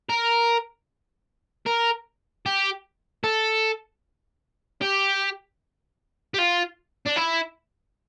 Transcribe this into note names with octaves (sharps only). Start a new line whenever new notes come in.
A#4
A#4
G4
A4
G4
G4
F4
D4
E4